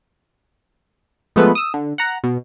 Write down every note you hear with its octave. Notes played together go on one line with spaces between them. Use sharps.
F3 G#3 A3 B3 A4 B4
D#6 E6
D3
F#5 A#5
B2